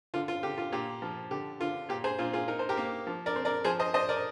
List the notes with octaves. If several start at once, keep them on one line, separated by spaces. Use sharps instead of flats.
D3 F4
F4
D3 G4
F4
A#2 G4
F3
D3 G4
D3 F4
A#2 G4
G#4 C5
A#2 F4
F4 G#4
D#4 A#4
C5
G4 A#4
A#3
F3
A#4 D5
C4
A#4 D5
F3 G#4 C5
C5 D#5
D4 C5 D#5
A#4 D5